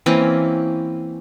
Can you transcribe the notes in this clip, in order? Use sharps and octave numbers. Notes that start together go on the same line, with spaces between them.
E3 A#3 C4 C#4